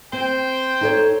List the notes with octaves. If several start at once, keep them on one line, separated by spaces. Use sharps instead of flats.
C4 C5 G5
D#4 A4 C#5